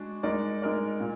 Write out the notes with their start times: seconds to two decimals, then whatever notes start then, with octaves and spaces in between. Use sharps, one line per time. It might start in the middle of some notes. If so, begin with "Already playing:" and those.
Already playing: G#3 D4 F#4
0.23 G#3 D#4 A#4 D5
0.62 G#3 D#4 A#4 D5
1.00 A#2